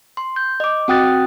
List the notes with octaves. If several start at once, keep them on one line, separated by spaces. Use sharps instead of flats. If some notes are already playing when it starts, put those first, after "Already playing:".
C6
G6
D#5 D6
C4 F#4 G5 D#6 F#6 A6